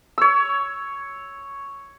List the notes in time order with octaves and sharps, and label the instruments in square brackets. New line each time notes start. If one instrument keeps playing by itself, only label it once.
[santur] C#5 E6